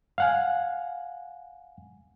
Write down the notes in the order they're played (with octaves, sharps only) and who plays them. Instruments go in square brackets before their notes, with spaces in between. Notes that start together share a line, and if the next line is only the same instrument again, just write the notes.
[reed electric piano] F5 F#5 G#5